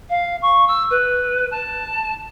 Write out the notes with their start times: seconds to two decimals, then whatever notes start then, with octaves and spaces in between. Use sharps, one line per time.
0.09 F5
0.42 C#6
0.67 E6
0.90 B4
1.51 A5